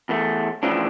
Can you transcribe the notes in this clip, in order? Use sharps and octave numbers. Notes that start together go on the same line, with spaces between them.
E2 A3
A2 C#3 E3 F3 D4